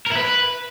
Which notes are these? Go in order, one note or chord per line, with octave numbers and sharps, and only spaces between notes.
A#4
E4
B4